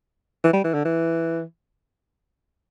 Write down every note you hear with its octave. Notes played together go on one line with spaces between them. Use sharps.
E3
G3
E3
D3
E3